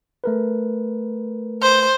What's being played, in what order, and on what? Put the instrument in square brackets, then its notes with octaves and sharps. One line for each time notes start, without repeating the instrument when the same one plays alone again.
[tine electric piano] A3 A#4 B4
[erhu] C5